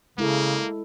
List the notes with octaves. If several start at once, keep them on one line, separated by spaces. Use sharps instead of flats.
C#3 G#3 A#3 E4 A4